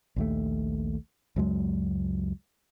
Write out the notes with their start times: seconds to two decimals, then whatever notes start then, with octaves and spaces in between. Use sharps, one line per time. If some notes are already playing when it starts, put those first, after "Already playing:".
0.16 A#1 D#2 A3
1.36 C#2 F#2 F#3 G#3